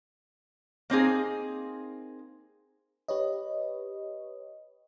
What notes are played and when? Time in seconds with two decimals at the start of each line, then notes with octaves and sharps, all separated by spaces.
0.90 A#3 C4 D#4 G#4
3.08 G4 B4 C#5 D#5